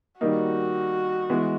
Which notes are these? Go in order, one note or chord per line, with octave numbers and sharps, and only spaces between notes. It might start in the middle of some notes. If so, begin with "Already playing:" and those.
D#3 G3 A#3 D#4 F#4
E3 G#3 B3